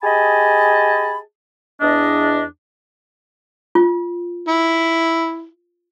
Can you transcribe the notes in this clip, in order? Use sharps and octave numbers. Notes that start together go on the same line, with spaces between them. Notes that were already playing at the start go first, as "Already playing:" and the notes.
G4 G#4 D#5 G#5 A5 B5
E2 D4 D#5
F4
E4